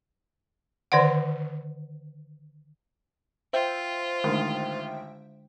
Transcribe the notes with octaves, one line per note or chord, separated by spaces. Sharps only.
D3 D#3 C5 D5 F#5
F4 C5 E5 G5
A1 D3 D#3 G#3 D4